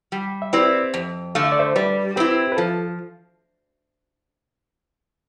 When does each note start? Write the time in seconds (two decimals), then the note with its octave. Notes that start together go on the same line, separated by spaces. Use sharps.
0.12 G3
0.42 E5
0.53 C4 E4 G4 B4 D5
0.94 F2
1.35 D3 A3 F5
1.44 E5
1.52 D5
1.59 C5 E5
1.75 G3 B4 D5
2.16 C4 E4 G4 B4
2.52 B4
2.57 F3 F4 A4